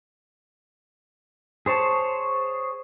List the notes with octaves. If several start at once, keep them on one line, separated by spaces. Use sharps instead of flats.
G#4 C5 C#5 A5